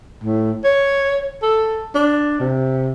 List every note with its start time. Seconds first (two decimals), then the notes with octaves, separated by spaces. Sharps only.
0.23 A2
0.64 C#5
1.42 A4
1.95 D4
2.40 C3